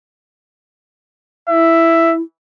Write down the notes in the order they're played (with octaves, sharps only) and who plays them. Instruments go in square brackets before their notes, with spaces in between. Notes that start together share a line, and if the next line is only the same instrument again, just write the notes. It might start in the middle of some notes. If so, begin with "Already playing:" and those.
[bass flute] E4 [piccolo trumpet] E5